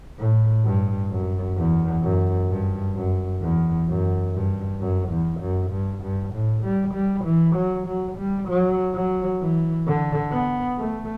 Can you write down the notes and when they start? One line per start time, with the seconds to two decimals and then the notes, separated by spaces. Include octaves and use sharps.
0.19 A2
0.65 G2
1.11 F#2
1.57 E2
2.03 F#2
2.49 G2
2.96 F#2
3.42 E2
3.88 F#2
4.34 G2
4.80 F#2
5.10 E2
5.41 F#2
5.71 G2
6.03 G2
6.33 A2
6.63 G3
6.94 G3
7.25 E3
7.55 F#3
7.87 F#3
8.18 G3
8.49 F#3
8.94 F#3
9.41 E3
9.87 D3
10.32 B3
10.78 A3